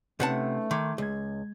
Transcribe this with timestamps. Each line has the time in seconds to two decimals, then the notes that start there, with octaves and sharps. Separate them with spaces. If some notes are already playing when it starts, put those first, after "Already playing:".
0.20 C3 A3 C#4 D#4 B4 F#5 A5
0.71 D#3 C6 D6 G#6
0.98 C#2 G#3 G#6